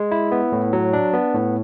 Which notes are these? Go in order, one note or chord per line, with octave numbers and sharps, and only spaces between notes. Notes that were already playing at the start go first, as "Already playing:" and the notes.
Already playing: G#3
E4
B3
A2
F#3
D4
B3
A2